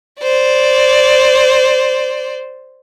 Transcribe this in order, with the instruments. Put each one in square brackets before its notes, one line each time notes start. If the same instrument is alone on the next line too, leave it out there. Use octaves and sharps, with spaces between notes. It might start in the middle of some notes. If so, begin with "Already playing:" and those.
[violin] C5 D5